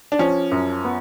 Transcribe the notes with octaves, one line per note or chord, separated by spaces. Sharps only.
D4
F3 C#4
F#2
B3